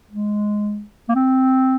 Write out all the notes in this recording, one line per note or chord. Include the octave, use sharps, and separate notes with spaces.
G#3
A#3
C4